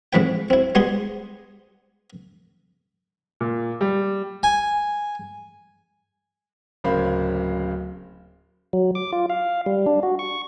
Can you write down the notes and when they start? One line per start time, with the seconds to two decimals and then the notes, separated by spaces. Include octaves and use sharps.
0.13 F2 G#2 E3 B4 G5
0.50 C4 E4
0.75 G3 G#3 B3 G4 G#4 C6
3.41 A#2
3.81 G3
4.43 G#5
6.84 D1 C#3 A#3 C5 F5 B5
8.73 F#3
8.95 D6
9.13 F4
9.30 F5
9.66 G3
9.86 D4
10.03 F#4
10.19 C#6